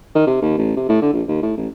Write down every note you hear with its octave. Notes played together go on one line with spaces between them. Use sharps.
D#3
C3
D#2
A1
C3
A2
D3
A#1
D#2
A2
A1